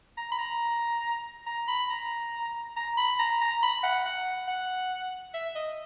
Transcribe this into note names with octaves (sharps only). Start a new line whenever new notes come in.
A#5
B5
A#5
A#5
B5
A#5
A#5
B5
A#5
A#5
B5
F#5
F#5
F#5
E5
D#5